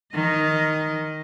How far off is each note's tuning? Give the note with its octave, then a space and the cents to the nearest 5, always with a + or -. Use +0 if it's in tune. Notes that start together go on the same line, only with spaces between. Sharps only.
D#3 +0 D#5 +0